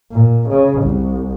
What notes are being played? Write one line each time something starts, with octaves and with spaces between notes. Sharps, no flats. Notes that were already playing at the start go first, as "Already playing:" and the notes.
A#2
C#3
C2